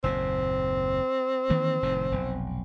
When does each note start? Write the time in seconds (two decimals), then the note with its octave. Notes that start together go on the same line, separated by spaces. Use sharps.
0.04 F#1 D#2 A#2 C4
1.50 D#3 E3 A#3
1.83 F1 A2 D#3
2.12 F1 B1